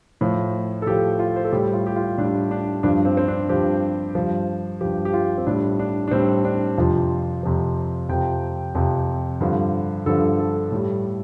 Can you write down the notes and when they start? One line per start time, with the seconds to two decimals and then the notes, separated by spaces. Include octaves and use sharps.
0.21 A2 F3
0.82 A4
0.86 A2 F3 G4
1.19 F4
1.36 C5
1.45 A4
1.52 A2 G3 G4
1.74 F4
1.86 G4
1.96 F4
2.18 A2 G3 D4
2.51 D4
2.83 G2 F3 D4
3.05 C4
3.17 C4
3.28 D4
3.49 G2 F3 G4
4.15 G2 F3
4.81 G2 F3 G4
5.05 G4
5.13 F4
5.38 C4
5.47 A2 G3 D4
5.79 D4
6.08 D4
6.11 A2 G3 C4
6.45 D4
6.78 F2 C3 F3 F4
7.43 F2 C3 F3
8.09 F2 C3 F3 G5
8.75 F2 C3 F3
9.41 G2 D3 F3
10.06 G2 D3 F3 A4
10.39 A4
10.72 A2 G3